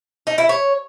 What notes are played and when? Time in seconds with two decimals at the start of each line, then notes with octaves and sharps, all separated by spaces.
0.27 D#4
0.38 E4
0.49 C#5